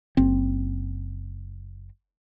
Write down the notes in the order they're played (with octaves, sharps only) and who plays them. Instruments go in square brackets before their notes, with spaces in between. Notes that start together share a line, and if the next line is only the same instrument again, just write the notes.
[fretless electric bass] F#1 C4